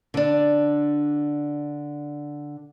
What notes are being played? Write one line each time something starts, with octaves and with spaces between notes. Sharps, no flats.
D3 D4